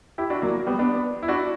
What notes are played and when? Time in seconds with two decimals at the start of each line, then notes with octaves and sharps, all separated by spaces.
0.18 E4 G4
0.30 D4 F#4
0.42 F#3 A#3
0.67 G3 B3
0.79 B3 D4
1.23 E4
1.28 D4 F#4